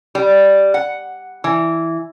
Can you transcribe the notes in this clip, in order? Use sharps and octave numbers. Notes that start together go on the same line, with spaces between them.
G3
F#5
E3